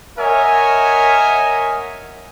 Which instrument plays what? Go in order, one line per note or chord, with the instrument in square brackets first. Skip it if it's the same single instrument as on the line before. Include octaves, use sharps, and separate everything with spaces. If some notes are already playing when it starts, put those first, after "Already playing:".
[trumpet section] A#4 C#5 D#5 E5 F#5 G#5